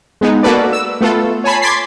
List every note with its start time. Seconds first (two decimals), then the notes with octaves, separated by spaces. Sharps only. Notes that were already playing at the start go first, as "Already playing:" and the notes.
0.21 G#3 B3 D#4
0.43 A#3 F#4 A4 B4 D5
0.72 E6
1.01 A3 B3 F4 A4
1.44 C#5 G#5 A5 B5 C7
1.62 C6 D6 G#6 A6 B6 C7